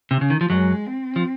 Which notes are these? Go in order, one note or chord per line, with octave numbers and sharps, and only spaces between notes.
C3
C#3
D#3
F3
F#2 F#3 G#3
C4
F3